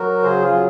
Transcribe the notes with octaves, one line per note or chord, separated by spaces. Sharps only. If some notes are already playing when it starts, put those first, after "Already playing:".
Already playing: F#3 F#4 A#4
C#3 G#4 C5
F4 G#4
F#3